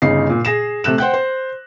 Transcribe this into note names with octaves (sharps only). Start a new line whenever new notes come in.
G1 C#3 D#4 C7
A#2
G#4 A#6 E7
C3 A3 F#6 E7
C5 F#5 G5 F#6
C5